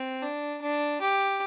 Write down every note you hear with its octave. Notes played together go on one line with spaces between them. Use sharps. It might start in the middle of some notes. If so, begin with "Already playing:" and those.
Already playing: C4
D4
D4
G4